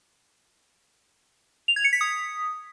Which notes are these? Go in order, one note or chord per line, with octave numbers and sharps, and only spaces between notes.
F7
G#6
C#7
B6
D#6